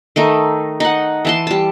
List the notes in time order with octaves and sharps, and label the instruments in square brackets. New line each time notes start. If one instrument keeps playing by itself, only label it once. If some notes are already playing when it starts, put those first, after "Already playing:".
[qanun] D#3 A3 D#4
D#4 F#5
E3 A5 C6
G3 A5